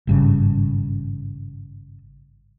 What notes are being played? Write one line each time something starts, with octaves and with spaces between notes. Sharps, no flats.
G#1 G2 C#3